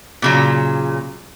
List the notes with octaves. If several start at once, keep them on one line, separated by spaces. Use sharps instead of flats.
A#2 C#3 F#3